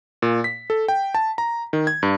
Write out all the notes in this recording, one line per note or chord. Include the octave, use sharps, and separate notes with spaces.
A#2
B6
A4
G5
A5
A#5
D#3
G#6
G2